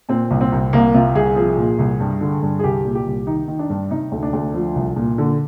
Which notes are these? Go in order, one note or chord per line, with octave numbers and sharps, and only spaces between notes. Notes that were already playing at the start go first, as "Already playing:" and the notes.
A#2 C4
C2
C4
C2
C2 A#3
C3 F4
C2 G#4
F3 G#4
A#2
C2
G2
D3
G2
G#4
C2 G4
A#2
G4
C2
D#3 D#4
D#3
D4
G2
C3 D#4
D2
D4
D2
F3
C2
A#2
D3